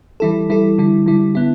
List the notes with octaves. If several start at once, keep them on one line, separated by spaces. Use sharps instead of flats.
E3 G3 E4 A4
E3 G3 E4 A4
D3 G3 E4
D3 G3 E4
D3 B3 E4